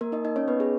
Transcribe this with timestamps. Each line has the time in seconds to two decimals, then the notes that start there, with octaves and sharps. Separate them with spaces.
0.01 A#3 A#4
0.12 D#4 D#5
0.25 D#4 D#5
0.36 C#4 C#5
0.48 B3 B4
0.60 G#4